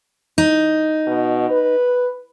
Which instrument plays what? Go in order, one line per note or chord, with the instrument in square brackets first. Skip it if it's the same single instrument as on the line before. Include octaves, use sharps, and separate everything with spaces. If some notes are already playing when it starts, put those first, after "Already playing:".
[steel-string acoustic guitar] D#4
[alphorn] B2
B4